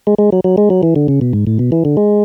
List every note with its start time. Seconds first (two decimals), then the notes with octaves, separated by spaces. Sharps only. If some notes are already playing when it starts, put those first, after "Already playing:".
0.07 G#3
0.18 G#3
0.32 F#3
0.44 F#3
0.58 G#3
0.70 F#3
0.83 E3
0.96 D3
1.08 C#3
1.21 B2
1.33 G#2
1.47 A2
1.59 B2
1.72 E3
1.85 D3
1.97 G#3